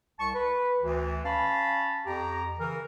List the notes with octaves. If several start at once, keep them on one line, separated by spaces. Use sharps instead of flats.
C2 A5 C#6
B4
D2 E3
C#4 F5 A5 B5
F2 G4 A#5
C#3 E3 A#4